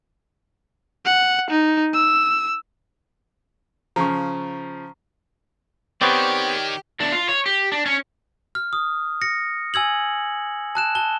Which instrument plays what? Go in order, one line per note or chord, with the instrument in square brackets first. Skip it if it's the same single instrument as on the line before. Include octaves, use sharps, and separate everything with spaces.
[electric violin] F#5
D#4
E6
[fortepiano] C#3 F3 [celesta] A#5 C#6
[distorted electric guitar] D#3 [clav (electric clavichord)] B3 C4 [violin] G4 [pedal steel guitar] C#5 D5
[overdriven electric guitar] E2 D4
F4
C#5
G4
D4
C#4
[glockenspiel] F6
D#6
A#6 C#7
G#5 E6 G#6 F#7
A5 F#6 E7
A5 G7